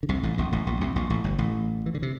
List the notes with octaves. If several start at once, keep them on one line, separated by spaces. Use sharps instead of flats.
D3
C2 C3
A1 A2
A#1 A#2
A1 A2
A#1 A#2
C2 C3
A#1 A#2
A1 A2
G1 G2
A1 A2
E3
D3
C3